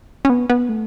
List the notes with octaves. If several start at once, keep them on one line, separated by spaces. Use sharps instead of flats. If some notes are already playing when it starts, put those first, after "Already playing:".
C#4
B3
B3
A3